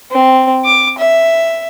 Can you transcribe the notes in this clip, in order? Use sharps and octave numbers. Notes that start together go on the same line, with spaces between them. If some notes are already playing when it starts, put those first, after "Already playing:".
C4
D6
E5